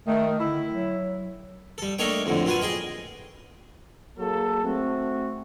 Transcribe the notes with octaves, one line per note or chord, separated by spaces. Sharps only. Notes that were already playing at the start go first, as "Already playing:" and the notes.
D#3 A3
D3 E4
F#3
G3 A4
A3 A#3 D4 D#4 C#5 G5
F2 A2 D3
A#2 F#3 F4 B4 G#5
G#4 D#5 G5
F#3 A#3 G#4 A4
A3 C4 F#4